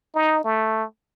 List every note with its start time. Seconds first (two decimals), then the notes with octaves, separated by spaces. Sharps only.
0.15 D#4
0.44 A3